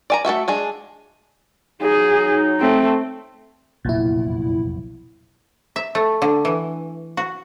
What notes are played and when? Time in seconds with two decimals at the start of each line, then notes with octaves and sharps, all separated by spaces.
0.10 D5 G#5 A#5
0.25 A3 F4 F#4 E5
0.48 G#3 D4 G#4
1.82 F#3 D#4 G#4
2.60 A3 C4
3.85 F1 B1 E2 A#2 E4
5.76 E5
5.95 A3
6.22 D3
6.45 E3
7.17 F#4